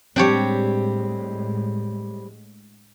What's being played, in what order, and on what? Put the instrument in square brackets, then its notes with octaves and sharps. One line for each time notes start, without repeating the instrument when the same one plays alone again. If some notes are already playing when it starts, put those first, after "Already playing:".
[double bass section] A2 G#3 [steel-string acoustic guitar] G3 C4 [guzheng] D4 G4 C#5